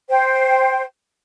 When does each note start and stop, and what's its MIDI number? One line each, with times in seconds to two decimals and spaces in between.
0.09 0.82 72
0.09 0.82 79